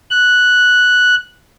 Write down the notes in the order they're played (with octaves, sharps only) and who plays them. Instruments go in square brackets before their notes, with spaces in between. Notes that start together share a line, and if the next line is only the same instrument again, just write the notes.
[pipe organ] F#6